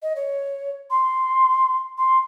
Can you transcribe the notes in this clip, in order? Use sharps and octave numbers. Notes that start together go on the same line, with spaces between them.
D#5
C#5
C6
C6